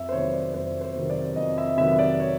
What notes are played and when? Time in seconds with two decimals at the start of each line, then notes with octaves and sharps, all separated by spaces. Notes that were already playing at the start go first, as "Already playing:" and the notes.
Already playing: F2 E5
0.09 C5
0.12 C3 D#3 F#3 B3 C#5
0.33 D5
0.54 F2 C5
0.81 C5
0.96 C3 D#3 F#3 B3
1.10 D5
1.36 F2 D#5
1.58 E5
1.77 C3 D#3 F#3 B3 E5
1.99 D5
2.20 C#5